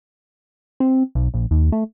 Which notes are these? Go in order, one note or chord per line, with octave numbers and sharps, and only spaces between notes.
C4
B1
A#1
D#2
A3